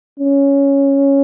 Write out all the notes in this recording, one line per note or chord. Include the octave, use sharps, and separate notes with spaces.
C#4